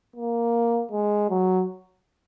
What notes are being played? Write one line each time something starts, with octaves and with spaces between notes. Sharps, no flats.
A#3
G#3
F#3